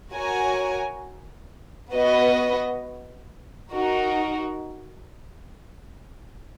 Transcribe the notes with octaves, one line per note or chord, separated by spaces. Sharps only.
F#4 A#4 C#5 G#5
B3 F#4 B4 D#5
D#4 F#4 A#4